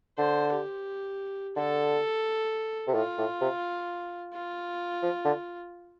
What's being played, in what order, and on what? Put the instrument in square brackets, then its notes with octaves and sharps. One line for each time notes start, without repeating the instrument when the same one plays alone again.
[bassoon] D3 [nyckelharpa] C5
[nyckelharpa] G4
[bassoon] D3 [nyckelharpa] A4
[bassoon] C3
[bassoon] A2 [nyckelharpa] F4
[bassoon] A2
C3
[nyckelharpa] F4
[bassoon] F3
D3